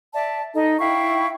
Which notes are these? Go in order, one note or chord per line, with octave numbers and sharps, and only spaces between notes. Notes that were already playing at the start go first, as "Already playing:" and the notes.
D5 E5 A5
D#4 A4 D#5
E4 F5 G5 C#6